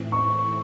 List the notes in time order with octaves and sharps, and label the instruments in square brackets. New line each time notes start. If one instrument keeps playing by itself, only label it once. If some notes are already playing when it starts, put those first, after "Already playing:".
Already playing: [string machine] A2 E3 C4 E4
[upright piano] C#6